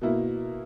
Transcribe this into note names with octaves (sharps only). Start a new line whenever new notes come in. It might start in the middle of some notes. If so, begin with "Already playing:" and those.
B2 A#3 E4